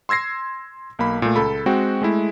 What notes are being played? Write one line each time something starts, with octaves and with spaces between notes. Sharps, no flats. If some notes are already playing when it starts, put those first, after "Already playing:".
C6 E6 G#6 A#6 C7
B1 A#3 B5
A#2 A3
C#2 A4 B5
G#3 C4 F#4 G5
G#3 A3 E4